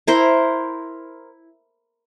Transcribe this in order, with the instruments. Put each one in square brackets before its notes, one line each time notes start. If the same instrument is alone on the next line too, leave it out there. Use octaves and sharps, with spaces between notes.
[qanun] E4 A#4 C5